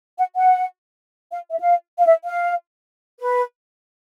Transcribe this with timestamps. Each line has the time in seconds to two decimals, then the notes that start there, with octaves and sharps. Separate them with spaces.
0.18 F#5
0.37 F#5
1.31 F5
1.50 E5
1.60 F5
1.98 F5
2.06 E5
2.25 F5
3.19 B4